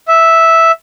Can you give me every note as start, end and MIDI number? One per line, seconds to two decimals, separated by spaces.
0.08 0.72 76